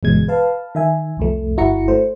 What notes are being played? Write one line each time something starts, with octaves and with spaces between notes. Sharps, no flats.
G1 E2 B2 G#3 G#6
B4 F5 A5
D#3 E5 G#5
C2 F2 A3
G1 E4 F#4 A#5 C#7
A3 C5